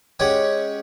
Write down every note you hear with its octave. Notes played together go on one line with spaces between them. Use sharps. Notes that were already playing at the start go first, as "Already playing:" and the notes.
G#3 C#4 G4 C#5 F#5 G5